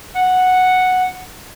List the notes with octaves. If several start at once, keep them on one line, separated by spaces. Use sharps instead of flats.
F#5